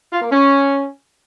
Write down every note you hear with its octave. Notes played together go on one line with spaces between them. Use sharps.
F4
A#3
C#4